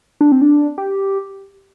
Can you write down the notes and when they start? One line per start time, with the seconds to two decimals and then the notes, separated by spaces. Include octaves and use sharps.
0.21 D4
0.32 C4
0.41 D4
0.78 G4